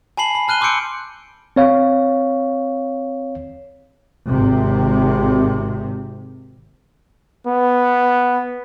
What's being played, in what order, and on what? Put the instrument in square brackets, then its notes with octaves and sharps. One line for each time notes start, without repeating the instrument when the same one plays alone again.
[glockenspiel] G#5 A5 B5 C7 F#7
B5
A5 F6 F#6 D#7 G7
C6 D6 E6 G6 C#7 D7
[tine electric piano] C4 C#5 F5
[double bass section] G#1 C3
[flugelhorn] B3